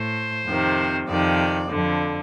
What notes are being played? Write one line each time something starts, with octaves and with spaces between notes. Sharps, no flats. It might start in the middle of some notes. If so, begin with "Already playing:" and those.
Already playing: A2 C5
F2 C3 D#3
F2 C3 D#3 D5
F2 D3